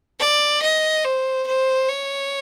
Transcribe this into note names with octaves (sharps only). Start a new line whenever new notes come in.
D5
D#5
C5
C5
C#5